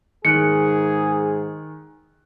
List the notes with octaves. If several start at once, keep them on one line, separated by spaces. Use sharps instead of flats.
G#2 D#3 G#4 F#6 C#7 D7